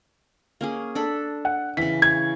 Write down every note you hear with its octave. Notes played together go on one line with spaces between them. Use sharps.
A#3 C#4 G#4
D4 A4 B5
F#5
C#3 E3 B6
G#6